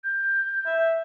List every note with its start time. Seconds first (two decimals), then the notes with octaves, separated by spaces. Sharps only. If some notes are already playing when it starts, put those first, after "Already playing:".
0.04 G6
0.66 E5